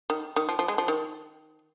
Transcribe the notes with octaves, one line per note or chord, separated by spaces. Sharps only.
D#3
D#3
F3
F3
G#3
F3
D#3